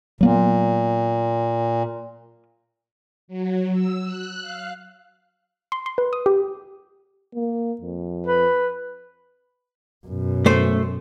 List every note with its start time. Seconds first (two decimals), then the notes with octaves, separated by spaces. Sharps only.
0.21 A#2 F#3 A#3 B3
3.28 F#3
3.73 E6
4.04 F#6
4.41 F5
5.72 C6
5.86 C6
5.98 B4
6.13 D#6
6.26 G4
7.35 A#3
7.81 F2
8.27 B4
10.07 F#2 B2
10.46 A3 C5